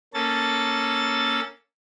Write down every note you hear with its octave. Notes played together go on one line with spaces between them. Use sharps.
A#3 C#4 A4 A6